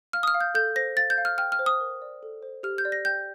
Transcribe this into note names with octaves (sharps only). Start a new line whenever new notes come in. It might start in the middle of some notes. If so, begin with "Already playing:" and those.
F5 F6
D#6
F6
F5
G6
A4 G6
C5 A#6
F5 A6
G6
F5
F6
G5 F6
F6
C5
D#6
A#4
D5
A4
C5
G4 F6
G6
D5
A#6
G5 G6